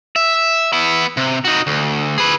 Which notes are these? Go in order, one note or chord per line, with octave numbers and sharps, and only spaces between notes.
E5
B3 E4
C3
D#4 F#4
D2
G#4 B4